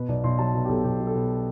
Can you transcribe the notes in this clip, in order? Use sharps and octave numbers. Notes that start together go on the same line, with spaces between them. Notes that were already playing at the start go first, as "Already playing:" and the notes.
Already playing: B2 B4
B1 D5
B1 C6
F#3 A5
B2 B4
G4
B1 A4
B1 G4
F#3
A4
B2